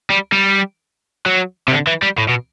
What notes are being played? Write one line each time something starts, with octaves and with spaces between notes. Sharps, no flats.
G3
G3
F#3
C3
D3
E3
G3
A2
B2